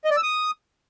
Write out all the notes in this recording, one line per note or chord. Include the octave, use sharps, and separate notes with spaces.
D#5
D5
E6
D#6